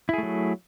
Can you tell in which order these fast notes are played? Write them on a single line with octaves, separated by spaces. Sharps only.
E4 G#4 A3 F#3